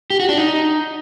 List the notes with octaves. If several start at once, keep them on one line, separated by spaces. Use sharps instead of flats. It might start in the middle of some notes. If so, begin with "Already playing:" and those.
G4
F#4
D4
D#4